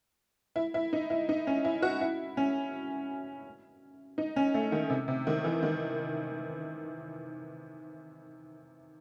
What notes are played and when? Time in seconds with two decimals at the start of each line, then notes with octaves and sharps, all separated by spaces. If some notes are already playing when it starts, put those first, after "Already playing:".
0.56 E4
0.74 E4
0.93 D#4
1.10 E4
1.29 D#4
1.47 C#4
1.65 E4
1.82 F#4
2.01 E4
2.37 C#4
4.18 D#4
4.36 C#4
4.54 A3
4.72 D#3
4.90 C3
5.08 C3
5.27 D#3
5.44 E3
5.63 D#3